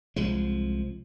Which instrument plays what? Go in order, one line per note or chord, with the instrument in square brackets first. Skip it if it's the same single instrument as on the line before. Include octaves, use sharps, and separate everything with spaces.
[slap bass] C2 F3 G#3